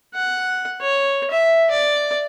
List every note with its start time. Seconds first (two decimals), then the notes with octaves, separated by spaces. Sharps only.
0.15 F#5
0.81 C#5
1.31 E5
1.71 D5